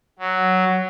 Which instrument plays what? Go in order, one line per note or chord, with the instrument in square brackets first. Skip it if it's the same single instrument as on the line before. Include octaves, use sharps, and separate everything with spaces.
[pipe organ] F#3